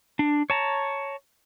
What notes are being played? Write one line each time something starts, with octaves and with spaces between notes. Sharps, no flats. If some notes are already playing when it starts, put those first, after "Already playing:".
D4
C#5 A5 A#5